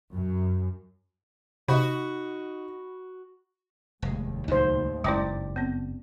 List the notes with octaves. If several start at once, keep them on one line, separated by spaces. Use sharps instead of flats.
F#2
C3 D#4 F#4 D#5 B5
F1 D#2 A2 G3 G#3
C#2 A#2 F#3 D#4 C5
F#1 G2 G#3 C#4 E4 D5 G5 D6
B3 C4